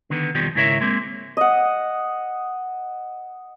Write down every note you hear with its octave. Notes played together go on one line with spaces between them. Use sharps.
D3 D#3 B3
F2 B2 D#3 F3 G3
G#2 C#3 E4 A#4 C#5 E5
G#3 A#3 C4
D#5 F#5